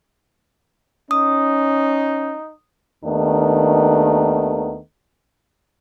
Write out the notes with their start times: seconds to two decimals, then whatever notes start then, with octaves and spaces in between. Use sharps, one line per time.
1.11 C#4 D#4 D#6
3.04 D#2 D#3 A3 B3 D4